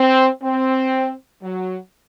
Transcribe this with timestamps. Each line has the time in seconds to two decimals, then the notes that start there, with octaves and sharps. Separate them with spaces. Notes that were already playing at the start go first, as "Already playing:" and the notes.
Already playing: C4
0.43 C4
1.42 F#3